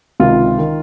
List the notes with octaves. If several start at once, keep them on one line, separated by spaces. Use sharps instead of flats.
C#2 C3 D#3 F4
D#3